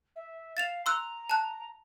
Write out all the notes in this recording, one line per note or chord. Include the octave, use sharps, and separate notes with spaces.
E5
F5 A6 E7 F7
A#5 C6 E6 F#6
A5 F#6